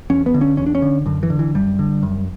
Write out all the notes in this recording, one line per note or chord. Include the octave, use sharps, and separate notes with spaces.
E2 C#4
B3
D3
C#4
E2 C#4
D4
C#4
D3
F#2 D3
E3
D3
E3
F#2 G3
D3
F#2